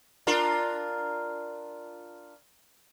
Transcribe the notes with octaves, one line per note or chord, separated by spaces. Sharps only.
D4 F4 A#4